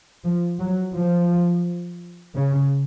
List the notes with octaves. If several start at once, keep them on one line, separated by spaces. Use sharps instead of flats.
F3
F#3
F3
C#3